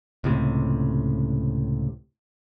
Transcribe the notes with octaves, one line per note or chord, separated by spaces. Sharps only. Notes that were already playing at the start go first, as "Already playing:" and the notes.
C#2 A2 C3